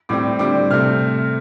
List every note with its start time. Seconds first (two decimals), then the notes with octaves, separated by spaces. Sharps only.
0.09 A2 G3 C4 D6
0.39 D3 G3 C4 D6
0.70 C3 A3 C4 F6